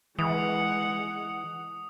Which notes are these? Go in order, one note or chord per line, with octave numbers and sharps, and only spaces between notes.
E3 G#3 F#5 D#6